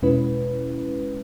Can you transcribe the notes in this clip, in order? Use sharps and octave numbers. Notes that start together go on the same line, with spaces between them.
E2 B2 G#3 C#4 E4 B4